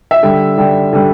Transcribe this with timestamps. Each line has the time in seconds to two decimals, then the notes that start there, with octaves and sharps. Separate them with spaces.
0.11 E5
0.23 D3 G3
0.58 D3 G3
0.93 D3 G3